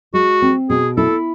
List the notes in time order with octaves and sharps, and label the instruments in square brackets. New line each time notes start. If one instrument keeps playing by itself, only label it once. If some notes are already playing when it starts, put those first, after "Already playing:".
[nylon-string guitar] G#3 [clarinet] F#4
[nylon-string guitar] C4
[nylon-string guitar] B2 [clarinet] G#4
[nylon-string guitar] E4 [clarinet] A4